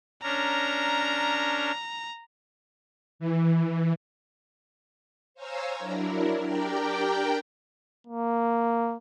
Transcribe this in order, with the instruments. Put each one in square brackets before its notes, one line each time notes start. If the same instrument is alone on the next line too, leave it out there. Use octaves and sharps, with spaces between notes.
[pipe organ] C#4 D4 A#4 [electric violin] A#5
[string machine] E3
C5 C#5 F5 G#5 A#5 E6
F#3 D4 E4 A#4
D4 G4 A#4 D5 G5 A#5
[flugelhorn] A#3